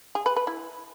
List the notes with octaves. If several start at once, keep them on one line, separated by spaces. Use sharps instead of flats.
G#4
B4
B4
E4